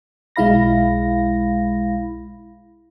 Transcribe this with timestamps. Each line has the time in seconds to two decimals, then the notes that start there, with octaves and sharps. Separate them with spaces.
0.36 B1 G#3 E4 F5 B5 A#6